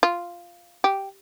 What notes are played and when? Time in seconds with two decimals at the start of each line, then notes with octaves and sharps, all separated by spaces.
0.03 F4
0.84 G4